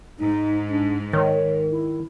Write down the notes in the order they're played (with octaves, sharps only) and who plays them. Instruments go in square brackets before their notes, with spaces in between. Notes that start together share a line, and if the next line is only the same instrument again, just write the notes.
[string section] G#2 [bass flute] D#4
[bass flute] D4
[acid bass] D#3 [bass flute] C#5
[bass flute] E4